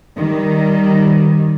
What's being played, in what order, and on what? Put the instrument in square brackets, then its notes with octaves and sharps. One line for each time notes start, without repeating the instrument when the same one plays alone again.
[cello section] D#3 G3